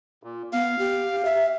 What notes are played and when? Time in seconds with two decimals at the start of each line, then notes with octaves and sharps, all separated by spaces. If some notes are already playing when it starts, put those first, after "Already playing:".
0.23 A#2
0.53 B3 F5
0.79 G4
1.25 E5